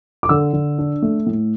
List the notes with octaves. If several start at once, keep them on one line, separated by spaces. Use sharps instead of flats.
D6
D3 E6
D3
D4
A3
A2